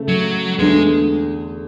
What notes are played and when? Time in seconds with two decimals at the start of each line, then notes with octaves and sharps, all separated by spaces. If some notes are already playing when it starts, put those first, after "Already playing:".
Already playing: C#3 A3
0.08 F#3
0.58 E2 D3 G#3 A3